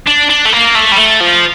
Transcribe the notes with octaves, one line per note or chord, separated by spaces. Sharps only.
D4
D4
A3
A#3
A3
G3
A3
F3